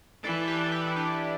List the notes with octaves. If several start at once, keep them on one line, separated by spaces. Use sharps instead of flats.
E3 A4 D5
G4 B4
A4
G4 B4
E4
D4 G4